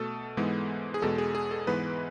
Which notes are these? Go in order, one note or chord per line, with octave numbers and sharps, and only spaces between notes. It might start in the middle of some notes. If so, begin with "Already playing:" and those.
Already playing: B2 A3 A4
G#2 E3 G#3 B3
G#4
E2 B2 G#3 A4
G#4
G#4
A4
G#2 E3 G#3 B3 B4